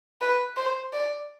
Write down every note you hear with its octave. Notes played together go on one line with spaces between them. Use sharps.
B4
C5
D5